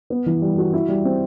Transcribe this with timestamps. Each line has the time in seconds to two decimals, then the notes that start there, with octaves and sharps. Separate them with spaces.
0.10 B3
0.26 E3
0.42 G3
0.58 F#4
0.73 E4
0.88 G3
1.05 C4